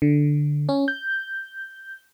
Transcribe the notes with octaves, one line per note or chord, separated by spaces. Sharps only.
D3
C#4
G6